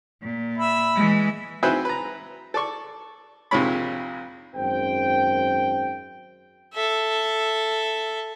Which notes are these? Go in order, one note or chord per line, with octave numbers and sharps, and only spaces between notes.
A#2
E5 B5
E3 G#3
C4 F#4 G#4 B4 E5 G5
B4 A#5
A4 D5 C#6
A#1 F2 C3 G#3 C#5 B5
G#1 F#2 C5 G5
A4 E5